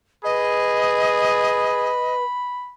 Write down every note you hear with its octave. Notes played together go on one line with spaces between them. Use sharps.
G#4 B4 D#5 B5